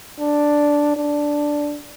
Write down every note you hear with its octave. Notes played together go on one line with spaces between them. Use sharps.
D4
D4